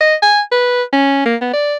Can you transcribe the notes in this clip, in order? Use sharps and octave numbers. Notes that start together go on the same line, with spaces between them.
D#5
G#5
B4
C#4
A#3
B3
D5